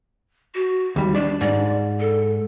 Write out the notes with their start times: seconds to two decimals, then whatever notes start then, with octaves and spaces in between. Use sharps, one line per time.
0.55 F#4
0.96 D#2 G3
1.15 D4 D5
1.41 G#2 D5
2.00 A4